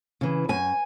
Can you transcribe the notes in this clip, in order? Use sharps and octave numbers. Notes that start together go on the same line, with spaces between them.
C#3 E3
F#2 G#5